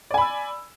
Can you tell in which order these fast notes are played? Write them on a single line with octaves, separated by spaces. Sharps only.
D5 G#5 B5 E6